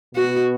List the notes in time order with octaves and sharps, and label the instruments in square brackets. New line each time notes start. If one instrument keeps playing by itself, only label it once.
[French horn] B2 [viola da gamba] F#4